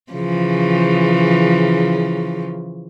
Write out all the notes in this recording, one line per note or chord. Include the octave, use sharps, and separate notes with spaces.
C#3 E3 F3